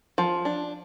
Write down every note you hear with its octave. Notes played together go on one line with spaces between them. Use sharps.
F3
D4